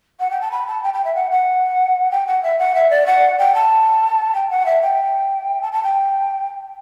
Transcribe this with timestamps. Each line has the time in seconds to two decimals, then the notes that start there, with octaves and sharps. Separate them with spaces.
0.20 F#5
0.31 G5
0.41 A5
0.51 B5
0.67 A5
0.83 G5
0.94 G5
1.05 E5
1.15 F#5
1.31 F#5
2.11 G5
2.27 F#5
2.43 E5
2.59 F#5
2.75 E5
2.90 D5
3.06 F#5
3.38 G5
3.54 A5
4.35 G5
4.50 F#5
4.66 E5
4.82 G5
5.62 A5
5.72 A5
5.84 G5